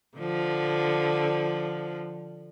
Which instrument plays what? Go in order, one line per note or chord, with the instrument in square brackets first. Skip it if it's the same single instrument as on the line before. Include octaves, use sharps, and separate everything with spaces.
[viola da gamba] D3 F3